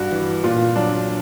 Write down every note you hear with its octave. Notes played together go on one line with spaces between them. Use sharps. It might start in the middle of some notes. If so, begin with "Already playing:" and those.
Already playing: G2 F#4
E3
A#2 F4
F#3 D4